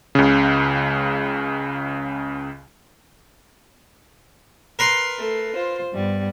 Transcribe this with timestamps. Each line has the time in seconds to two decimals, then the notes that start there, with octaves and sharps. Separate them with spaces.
0.15 C#2 C#3
4.79 A#4 B4 C6
5.19 A3
5.53 F4 C5
5.93 G2 G3 B3